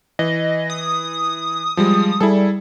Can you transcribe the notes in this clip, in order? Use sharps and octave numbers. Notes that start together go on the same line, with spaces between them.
E3 D#5
D#6
F3 G3 G#3
G3 E4 G#4 A4